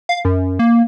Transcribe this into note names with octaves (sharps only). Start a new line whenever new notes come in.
F5
F#2
A#3